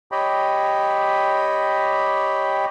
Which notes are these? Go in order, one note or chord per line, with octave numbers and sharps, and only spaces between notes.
G4 C#5 D#5 G5 B5